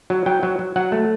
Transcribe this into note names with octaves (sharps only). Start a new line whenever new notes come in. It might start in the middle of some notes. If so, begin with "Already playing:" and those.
F#3
F#3 G5
F#3
F#3
F#3 F#5
A3